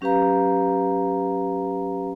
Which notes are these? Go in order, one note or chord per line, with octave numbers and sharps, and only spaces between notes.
F#3 C#4 G4 B4 F5 A#5